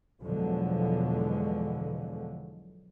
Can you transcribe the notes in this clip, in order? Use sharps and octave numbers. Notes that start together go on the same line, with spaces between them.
E2 B2 D3 F3 F#3 G#3